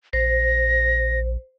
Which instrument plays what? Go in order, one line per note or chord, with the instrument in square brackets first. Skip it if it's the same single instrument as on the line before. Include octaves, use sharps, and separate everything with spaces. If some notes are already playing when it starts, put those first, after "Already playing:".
[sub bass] A#1 [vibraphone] C5 [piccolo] A#6